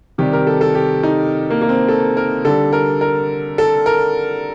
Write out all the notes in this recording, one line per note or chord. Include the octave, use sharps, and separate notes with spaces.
C3 D#3 G3 G4
A#4
A4
A4
G4
D#4
A#3
A#3
C4
A4
A#4
D3 G3 A4
A#4
A#4
A4
A#4